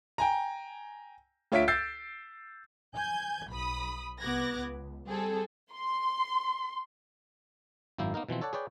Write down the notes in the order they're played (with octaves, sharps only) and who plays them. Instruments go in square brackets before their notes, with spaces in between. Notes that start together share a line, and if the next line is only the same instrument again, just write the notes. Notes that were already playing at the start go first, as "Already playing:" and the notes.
[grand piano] G5 G#5 A#5
D2 F4 C#5 E5 B6 D7
E6 G6 A6 C7
[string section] G#5 G6 G#6
B1 B5 D#6
C2 B3 D6 F#6 G#6 A#6
C#2
G3 C4 G#4 A4
[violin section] C6
[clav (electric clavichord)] G#1 F#2 A#3 E4 G5
A#3 B3 D#4 A#4
B2 E3 F3 C4
A4 C#5 D5 F#5 A5
G#4 B4 C#5 D5 G5